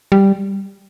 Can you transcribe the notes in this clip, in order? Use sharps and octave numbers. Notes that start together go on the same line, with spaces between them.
G3